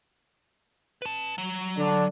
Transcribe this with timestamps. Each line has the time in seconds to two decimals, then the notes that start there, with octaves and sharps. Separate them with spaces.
1.02 B4 A5
1.38 F#3
1.77 D3 D4